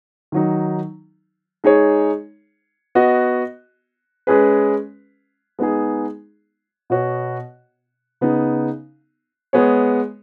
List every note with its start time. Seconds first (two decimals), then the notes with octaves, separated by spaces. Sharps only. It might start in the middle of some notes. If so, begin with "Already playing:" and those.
0.32 D#3 F#3 D#4
1.64 G#3 D#4 G#4 C#5
2.95 B3 F#4 D#5
4.27 G#3 C#4 G#4 B4
5.59 G#3 B3 D#4 G#4
6.90 B2 B3 F#4 C#5
8.21 C#3 B3 D#4
9.53 G#3 B3 G#4 C#5